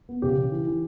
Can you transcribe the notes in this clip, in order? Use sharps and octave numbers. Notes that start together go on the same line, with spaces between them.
B3
C#3 G4
C#3
E3
E3